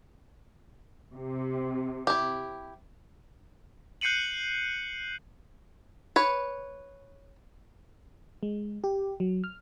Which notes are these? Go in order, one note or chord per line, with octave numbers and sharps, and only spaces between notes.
C3
E4 G4
F#6 G6 C7 C#7 D#7 F#7
B4 C#5
G#3
G4
F#3
F6